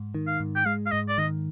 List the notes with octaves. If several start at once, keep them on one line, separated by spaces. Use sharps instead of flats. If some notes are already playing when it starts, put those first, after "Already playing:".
Already playing: G#2
D#3
F5
G#2
G5
G#3 F5
F5
G#2 D#5
D5
D#3 D#5